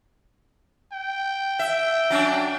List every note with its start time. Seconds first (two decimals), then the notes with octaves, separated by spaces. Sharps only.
0.93 G5
1.59 E5
2.10 F#3 C#4 D4